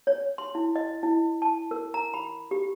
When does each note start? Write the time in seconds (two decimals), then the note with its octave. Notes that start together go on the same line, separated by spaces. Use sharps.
0.07 C#5
0.38 C6
0.55 E4
0.76 D#5
1.03 E4
1.42 A5
1.71 A#4
1.94 A#5
2.14 B5
2.51 G4